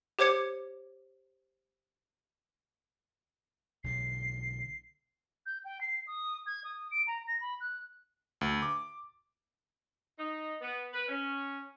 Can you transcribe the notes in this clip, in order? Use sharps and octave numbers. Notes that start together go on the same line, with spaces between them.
G4 C5 C#5 D6 G#6 C#7
B1 D3 C7
G6
G5
C7
D#6
G#6
D#6
D7
A#5
A#6
B5
F#6
D2
D6
D#4
B3
B4
C#4